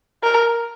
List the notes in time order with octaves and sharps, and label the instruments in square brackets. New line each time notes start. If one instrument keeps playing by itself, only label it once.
[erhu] A#4